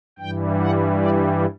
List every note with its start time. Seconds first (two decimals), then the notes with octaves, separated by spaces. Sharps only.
0.19 G2 E3 G3 G5
0.59 F#5
0.98 D5